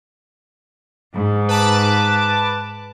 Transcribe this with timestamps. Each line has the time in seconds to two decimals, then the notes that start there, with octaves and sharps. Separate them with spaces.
1.15 G#2
1.48 B4 A5 D6